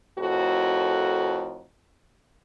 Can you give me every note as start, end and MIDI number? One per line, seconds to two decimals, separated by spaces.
0.19 1.65 41
0.19 1.65 45
0.19 1.65 66
0.19 1.65 70